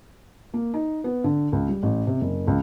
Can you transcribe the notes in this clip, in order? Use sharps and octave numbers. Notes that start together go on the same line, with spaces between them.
A#3
D#4
B3
D3
C#2
G3
A1
C3
F#1
C#2